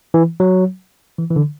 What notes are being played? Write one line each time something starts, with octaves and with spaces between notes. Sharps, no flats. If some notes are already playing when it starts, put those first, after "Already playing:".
E3
F#3
E3
E3
D3